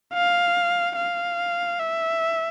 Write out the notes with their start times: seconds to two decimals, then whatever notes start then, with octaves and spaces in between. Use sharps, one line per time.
0.14 F5
0.96 F5
1.79 E5